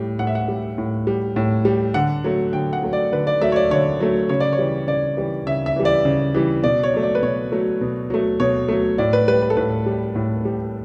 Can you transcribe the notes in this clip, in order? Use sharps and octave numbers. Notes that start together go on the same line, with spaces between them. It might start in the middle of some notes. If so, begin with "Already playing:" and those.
Already playing: A2 G3
A2 F#5
E5
F#5
G3
A2
G3
A2
G3
D3 F#5
F#3 A3
D3 G5
F#5
F#3 A3
D5
D3 B4
D5
F#3 A3 E5
C#5
D5
D3 C#5
F#3 A3
C#3 C#5
D5
C#5
E3 G3
C#3 D5
E3 G3
C#3 E5
E5
E3 G3
D5
C#3
E3 G3
B2 D5
C#5
F#3 A3
D5
B4
B2 C#5
F#3 A3
B2
F#3 A3
B2 C#5
F#3 A3
A2 D5
B4
G3 B4
B4
A4
A2 B4
G3
A2
G3